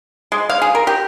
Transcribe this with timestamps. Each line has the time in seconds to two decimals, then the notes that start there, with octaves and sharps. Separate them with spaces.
0.32 G#3
0.50 F5
0.62 G#4
0.75 A#4
0.87 G4